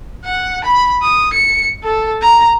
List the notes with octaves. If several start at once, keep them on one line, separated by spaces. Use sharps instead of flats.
F#5
B5
D#6
C#7
A4
A#5